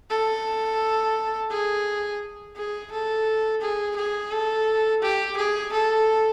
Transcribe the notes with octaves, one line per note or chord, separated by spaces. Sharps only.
A4
G#4
G#4
A4
G#4
G#4
A4
G4
G#4
A4